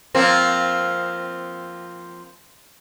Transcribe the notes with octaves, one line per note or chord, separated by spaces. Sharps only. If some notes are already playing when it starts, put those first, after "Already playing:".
F3 A#3 C4